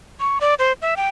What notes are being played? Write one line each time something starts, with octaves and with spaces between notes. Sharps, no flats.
C#6
D5
C5
E5
G5